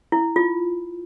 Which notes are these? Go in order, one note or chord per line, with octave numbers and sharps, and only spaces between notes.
E4
F4